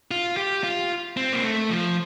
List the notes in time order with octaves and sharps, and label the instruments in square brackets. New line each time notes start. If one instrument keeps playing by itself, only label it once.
[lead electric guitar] F4
G4
F4
C4
A#3
A3
F3